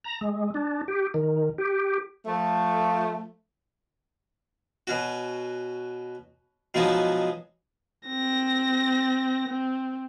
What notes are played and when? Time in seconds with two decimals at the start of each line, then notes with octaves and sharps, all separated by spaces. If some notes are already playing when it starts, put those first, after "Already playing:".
0.04 A#5
0.21 G#3
0.54 D4
0.88 G4
1.14 D#3
1.58 G4
2.26 F3 A3
4.87 B2 C#4 F#4
6.74 B2 F3 F#3 G#3 B3 D#4
8.08 C4 A#6
9.48 C4